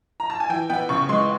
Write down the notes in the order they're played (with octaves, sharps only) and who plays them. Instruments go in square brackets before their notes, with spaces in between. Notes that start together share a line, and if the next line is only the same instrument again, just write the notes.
[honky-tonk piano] A#5
A5
G#5
E3 G5
B3 G5
C#3 C#6
G#3 C6